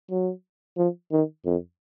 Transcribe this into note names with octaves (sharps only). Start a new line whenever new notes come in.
F#3
F3
D#3
F2